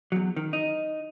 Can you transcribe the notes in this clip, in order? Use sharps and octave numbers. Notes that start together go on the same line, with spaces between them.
E2 F#3
D#3
D#4